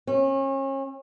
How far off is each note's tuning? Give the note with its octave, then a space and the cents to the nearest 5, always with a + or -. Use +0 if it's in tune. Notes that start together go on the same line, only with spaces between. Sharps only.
C#4 -35